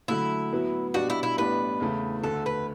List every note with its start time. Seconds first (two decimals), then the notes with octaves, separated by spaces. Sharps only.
0.08 D3 F#3 A3 E4
0.52 A2 F#3 B3 F#4
0.94 B2 G3 D4 F#4
1.10 E4
1.23 E4
1.38 A1 A2 G3 B3 D4 B4
1.80 E2 C#3 E3 A3
2.23 D2 D3 A3 A4
2.46 B4